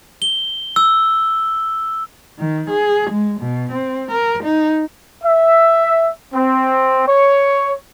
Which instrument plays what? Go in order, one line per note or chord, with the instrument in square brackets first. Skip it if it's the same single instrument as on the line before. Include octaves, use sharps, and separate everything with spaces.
[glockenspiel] G7
E6
[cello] D#3
G#4
G#3
B2
C4
A#4
D#4
[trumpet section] E5
C4
C#5